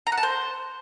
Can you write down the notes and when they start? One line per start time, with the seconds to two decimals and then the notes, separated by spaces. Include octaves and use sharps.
0.07 A#5
0.12 F#5
0.18 A5
0.23 C5